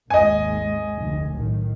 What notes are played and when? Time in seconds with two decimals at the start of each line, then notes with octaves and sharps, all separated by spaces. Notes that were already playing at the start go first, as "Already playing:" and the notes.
0.10 G#1 D#2 G#3 D#5 G#5
0.95 F1 D2
1.34 B1 A2 D#3